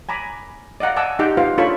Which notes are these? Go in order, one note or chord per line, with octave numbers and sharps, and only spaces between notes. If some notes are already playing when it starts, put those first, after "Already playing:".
G#5 A#5 B5 D6
D5 D#5 F5 F#5 A#5
F#5 G#5 A5 D6 E6
D#4 G4 F#5 G5 D6
F4 G4 B4 C5 F5
D4 F4 A4 C#5 B5 C#6